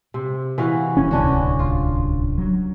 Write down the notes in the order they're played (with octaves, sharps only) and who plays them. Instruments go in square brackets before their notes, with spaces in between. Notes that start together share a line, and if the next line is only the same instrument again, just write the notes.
[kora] C3
E3 F#4 F5
[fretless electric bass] E1 B2 C#4
[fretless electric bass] D1 C2 D3 [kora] C#4 D4 F#4
[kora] F4
[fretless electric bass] F#3